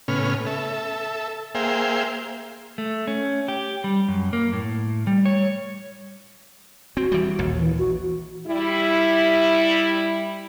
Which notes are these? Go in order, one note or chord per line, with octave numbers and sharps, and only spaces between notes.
A2 C#3 B3 C#4 F6
A4 E5
A#3 G#4 C5 E5 F5 G5
A3
C#4
G4
G3
F#2
A#3
A2
G3
C#5
C4 F#4
E3 G3
A#1 D#2
E3
F#4
G3 E4